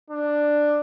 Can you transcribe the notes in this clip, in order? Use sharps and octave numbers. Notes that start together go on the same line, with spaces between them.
D4